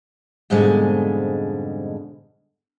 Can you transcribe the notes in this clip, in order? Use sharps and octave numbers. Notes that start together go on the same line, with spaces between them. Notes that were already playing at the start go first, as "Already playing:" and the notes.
F2 G#2 B2 D3 G3 G#3